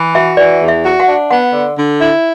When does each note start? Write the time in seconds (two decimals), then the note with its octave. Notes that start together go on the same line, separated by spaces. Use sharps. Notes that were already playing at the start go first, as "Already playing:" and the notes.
Already playing: E3
0.14 F#4 E5
0.37 E3 D5
0.61 E2
0.68 E5
0.84 F#4
1.00 F#5
1.07 D4
1.30 B3 F#5
1.53 D3
1.76 D3
2.00 E4